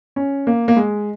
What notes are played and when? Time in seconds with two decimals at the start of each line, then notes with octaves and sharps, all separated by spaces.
0.16 C#4
0.47 A#3
0.68 A#3
0.77 G#3